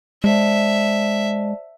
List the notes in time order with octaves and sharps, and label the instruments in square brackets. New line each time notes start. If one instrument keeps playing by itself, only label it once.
[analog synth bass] G#3 [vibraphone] C5 D5 A5 [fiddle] E5